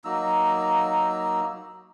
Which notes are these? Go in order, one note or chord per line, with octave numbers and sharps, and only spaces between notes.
F#3 A#3 D#4 E6